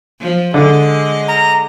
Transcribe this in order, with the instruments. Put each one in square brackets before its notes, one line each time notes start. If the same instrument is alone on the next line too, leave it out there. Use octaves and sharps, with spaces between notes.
[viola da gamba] F3
[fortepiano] D3 [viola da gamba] G#3 D#5
[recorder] A#5